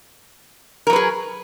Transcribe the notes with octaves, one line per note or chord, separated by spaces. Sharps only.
F#3 G#4 A#4 B4